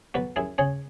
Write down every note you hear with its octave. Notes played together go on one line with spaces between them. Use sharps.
B1 F#4 B4
F#2 E4 G#4
C#3 G#4 C#5